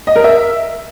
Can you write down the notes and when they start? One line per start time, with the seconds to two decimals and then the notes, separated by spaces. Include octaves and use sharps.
0.07 D#5
0.16 A#4
0.24 E5